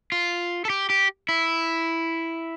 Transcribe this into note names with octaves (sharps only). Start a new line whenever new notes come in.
F4
A4
G4
G4
E4